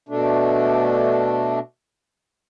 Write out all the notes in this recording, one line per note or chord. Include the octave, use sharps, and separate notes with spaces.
B2 A3 D4